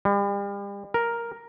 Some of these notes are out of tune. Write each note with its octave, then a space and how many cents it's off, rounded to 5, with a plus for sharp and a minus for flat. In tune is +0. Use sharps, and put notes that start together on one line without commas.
G3 +40
A#4 +5